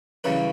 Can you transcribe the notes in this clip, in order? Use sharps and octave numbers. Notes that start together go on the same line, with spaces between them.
F#2 C#3 E3 G3 B4 C#5